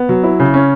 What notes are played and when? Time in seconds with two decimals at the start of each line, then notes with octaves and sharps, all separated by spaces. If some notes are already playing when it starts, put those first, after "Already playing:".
Already playing: B3
0.09 F#3
0.24 E4
0.40 C#3
0.54 C#4